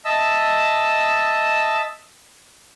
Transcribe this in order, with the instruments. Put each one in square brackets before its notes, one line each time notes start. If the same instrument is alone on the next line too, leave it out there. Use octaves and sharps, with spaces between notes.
[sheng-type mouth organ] D#5 E5 A5 E6